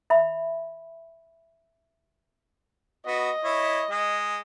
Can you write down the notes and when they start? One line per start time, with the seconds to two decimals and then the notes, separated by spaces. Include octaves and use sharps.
0.10 E5 B5
3.06 B3 F#4 D#5
3.44 E4 C#5
3.91 G#3